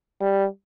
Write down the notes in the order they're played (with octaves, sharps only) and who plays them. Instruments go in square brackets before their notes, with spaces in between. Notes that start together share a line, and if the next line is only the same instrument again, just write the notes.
[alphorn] G3